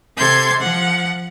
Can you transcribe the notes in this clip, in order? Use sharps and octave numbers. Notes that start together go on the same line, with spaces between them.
C3 A4 C5 C6 G6 G#6
F3 F#5